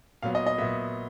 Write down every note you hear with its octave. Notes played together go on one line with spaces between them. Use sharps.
A#2 F#3 B3 F5
D#5
D#5
A#2 F#3 B3 E5